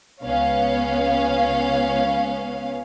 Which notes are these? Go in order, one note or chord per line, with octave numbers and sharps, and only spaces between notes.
C#2 B3 C#4 F5